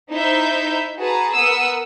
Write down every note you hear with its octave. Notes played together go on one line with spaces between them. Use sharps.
D#4 E4 C5 E5 A#5 G6
F#4 G#4 B4 A5 A#5
B3 A#4 F#5 D#6 E6